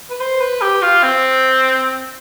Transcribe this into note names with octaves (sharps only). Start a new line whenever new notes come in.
B4
C5
B4
G4
F4
C4